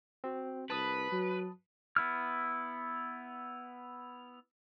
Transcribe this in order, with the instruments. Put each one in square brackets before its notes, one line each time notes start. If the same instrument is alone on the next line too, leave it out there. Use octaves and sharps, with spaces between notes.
[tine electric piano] C4 F#4
[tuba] C2 [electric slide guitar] B4 [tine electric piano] A5 B5 D#6
[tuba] F#3
[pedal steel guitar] B3 E4 F6